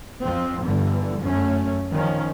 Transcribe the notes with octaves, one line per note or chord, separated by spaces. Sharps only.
F2 F3 C4
G1 G2 D3 E3
F#2 A3 C#4
D#3 F3 C#4